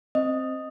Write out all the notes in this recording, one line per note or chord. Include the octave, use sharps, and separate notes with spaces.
C4 D#5